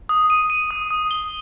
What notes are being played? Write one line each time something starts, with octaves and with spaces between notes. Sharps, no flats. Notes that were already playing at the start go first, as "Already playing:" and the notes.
D#6
D#7
D#7
D#6
D#6
G7